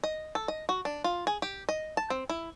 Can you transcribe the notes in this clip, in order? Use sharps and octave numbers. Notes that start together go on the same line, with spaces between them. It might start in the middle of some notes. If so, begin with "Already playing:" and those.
D#5
A4
D#5
F#4
D4
F4
G#4
G4
D#5
A5
C4
E4